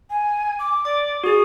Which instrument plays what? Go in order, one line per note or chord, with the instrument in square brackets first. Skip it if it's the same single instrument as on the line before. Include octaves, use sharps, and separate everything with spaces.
[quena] G#5
D6
[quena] D5 [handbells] D6
[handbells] F#4 G#4 [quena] D#6